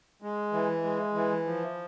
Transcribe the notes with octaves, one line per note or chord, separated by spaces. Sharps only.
G#3
E3
G#3
E3
F3